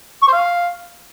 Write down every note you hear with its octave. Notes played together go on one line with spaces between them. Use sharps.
C#6
C5
F5